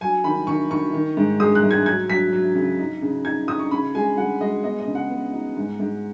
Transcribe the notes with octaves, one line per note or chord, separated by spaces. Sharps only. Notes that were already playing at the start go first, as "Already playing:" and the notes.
F#3 G#5
D#3 B5
D#3 C#6
D#3 C#6
D#3
G#2
G#3 D#6
F#6
G#2
G#6
F#3 G#6
F#3 B6
F#3
C#3
D#4
C#3
D#4 G#6
D#4 D#6
C#6
C#3 B5
G#3 G#5
G#3 F#5
G#3 D#5
B3 D#5
D#5
C#3
F#5
B3
D#4
G#2
G#2